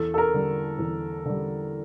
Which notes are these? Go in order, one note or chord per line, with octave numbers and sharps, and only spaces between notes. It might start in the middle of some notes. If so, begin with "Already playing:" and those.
Already playing: E2 A4
A4
A#4
D3 G3
E2
D3 G3